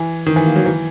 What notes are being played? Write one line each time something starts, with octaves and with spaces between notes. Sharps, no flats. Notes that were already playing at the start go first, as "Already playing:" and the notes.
Already playing: E3
D#3
E3
A#3
F#3
E3